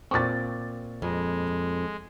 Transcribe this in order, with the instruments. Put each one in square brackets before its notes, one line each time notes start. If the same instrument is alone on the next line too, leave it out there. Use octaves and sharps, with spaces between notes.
[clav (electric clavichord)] A#2 C4 [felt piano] C#6 D6 A6
[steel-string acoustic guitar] F2 [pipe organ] G#3